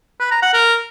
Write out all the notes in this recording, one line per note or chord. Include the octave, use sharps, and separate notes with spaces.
B4
A#5
F#5
A#4